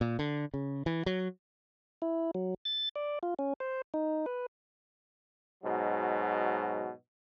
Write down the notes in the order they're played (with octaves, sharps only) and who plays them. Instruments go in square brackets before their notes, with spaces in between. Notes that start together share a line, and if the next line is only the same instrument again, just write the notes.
[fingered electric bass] A#2
D3
C#3
E3
F#3
[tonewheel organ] E4
F#3
A6
D5
F4
C#4
C5
D#4
B4
[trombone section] G#2 B2 F#3